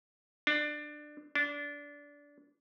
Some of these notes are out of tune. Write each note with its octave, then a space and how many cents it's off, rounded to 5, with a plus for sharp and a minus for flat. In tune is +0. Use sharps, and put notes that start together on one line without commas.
D4 +20
D4 -20